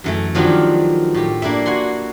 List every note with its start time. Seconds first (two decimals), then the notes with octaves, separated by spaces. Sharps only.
0.04 F#2 E3 A3
0.35 D#3 F3 F#3 D4 F4 G4
1.14 A2 G4
1.42 A#3 D4 E4 E5
1.66 F#4 F#5 G#5 C6